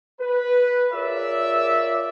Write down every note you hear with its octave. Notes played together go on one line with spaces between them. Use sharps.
B4
F4 G#4 A#4 C#5 D5 E5